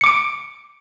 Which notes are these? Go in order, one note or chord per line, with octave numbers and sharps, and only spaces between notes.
D6 C#7 D7